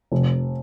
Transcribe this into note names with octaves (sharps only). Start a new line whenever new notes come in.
F1